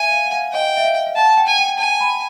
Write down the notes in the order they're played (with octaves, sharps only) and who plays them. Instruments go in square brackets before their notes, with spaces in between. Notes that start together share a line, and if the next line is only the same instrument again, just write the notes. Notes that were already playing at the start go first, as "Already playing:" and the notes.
Already playing: [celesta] E5 [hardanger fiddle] G#5
[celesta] F5
F#5
F5
[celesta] D#5 [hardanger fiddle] G5
[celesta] E5
F5
F5
[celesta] F#5 [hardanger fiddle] A5
[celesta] G5
[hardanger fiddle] G#5
[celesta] G5
[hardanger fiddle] G#5 [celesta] A5
[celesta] B5